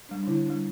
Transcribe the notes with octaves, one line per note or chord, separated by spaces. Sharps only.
G3 D4
D4
D3 E4
G3 D4